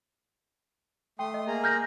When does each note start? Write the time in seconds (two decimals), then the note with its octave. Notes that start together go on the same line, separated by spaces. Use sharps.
1.19 A3 G5 C6 D#6
1.34 D#5
1.47 A#3 G#4 A#5
1.64 F6 G6 A#6